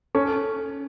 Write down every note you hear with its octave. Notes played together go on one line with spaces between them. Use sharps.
C#4 A4